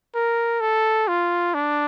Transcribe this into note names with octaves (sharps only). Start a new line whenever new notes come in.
A#4
A4
F4
D4